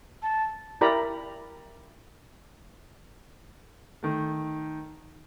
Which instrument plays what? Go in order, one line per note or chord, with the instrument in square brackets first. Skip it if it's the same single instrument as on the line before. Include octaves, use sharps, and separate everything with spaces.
[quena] A5
[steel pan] E4 G4 A#4 D5 A#5 B5
[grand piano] D#3 A3